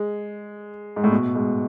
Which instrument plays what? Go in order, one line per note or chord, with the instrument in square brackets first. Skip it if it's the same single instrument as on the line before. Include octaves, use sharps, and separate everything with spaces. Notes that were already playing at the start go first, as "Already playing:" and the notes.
Already playing: [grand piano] G#3
G#2
A2
B2
G#2